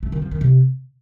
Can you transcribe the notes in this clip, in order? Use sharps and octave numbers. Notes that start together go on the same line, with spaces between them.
A3
D#3
F3
D#3
C3